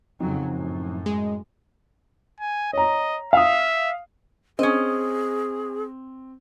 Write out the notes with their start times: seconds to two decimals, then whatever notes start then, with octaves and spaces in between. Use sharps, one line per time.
0.20 F2 C#3 F3 F#3 C4 D#4
0.52 F#2 A2
1.06 G#3
2.40 G#5
2.73 C#5 D#5 A#5
3.33 E5 F5 D#6
4.59 C4 C#4 G#4 D#5